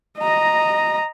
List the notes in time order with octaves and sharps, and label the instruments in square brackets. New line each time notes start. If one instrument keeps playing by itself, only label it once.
[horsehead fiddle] D#5 A#5